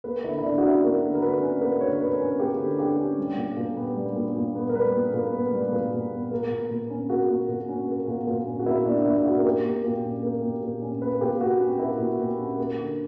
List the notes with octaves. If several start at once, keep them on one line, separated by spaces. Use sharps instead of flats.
A#3 B4
D3 E4
E4
D3 D4
F#4
C#4 E4
A#3 A#4
D3
A#4
D3 B4
C#4
A#3 B4
D3 C#5
D3 B4
C#4
A#3 G4
D3
D3 G4
C#4
G3
A#2
A#2
B3
G3
A#2
A#2
B3
A#4
G3 B4
A#2
A#2 A#4
B3
G3
A#2
A#2
B3
A#3
A#2
A#2
C#4
A#3 F#4
A#2
A#2
C#4
A#3
A#2
A#2
C#4
F#4
A#3 E4
A#2 D4
A#2 E4
E4
C#4 F#4
A#4
A#3 G4
A#2
A#2
C#4
A#3
A#2
A#2
C#4
A#3 B4
A#2 G4
A#2 F#4
C#4
A#3 E4
A#2
A#2
C#4
A#3
D3